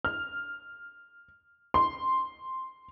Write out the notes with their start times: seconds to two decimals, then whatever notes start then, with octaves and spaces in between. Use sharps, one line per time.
0.05 F6
1.74 C6